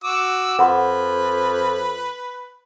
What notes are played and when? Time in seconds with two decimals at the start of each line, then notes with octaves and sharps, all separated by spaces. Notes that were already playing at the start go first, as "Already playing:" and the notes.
0.04 F#4 D6 E6
0.59 F2 B4 F#5 B5 C6